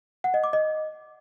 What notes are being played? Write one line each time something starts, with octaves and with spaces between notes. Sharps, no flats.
F#5
D#5
D6
D#5